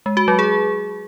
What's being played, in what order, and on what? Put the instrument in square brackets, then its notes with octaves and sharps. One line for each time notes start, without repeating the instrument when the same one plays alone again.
[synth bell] G#3
F#4
F#3
G#4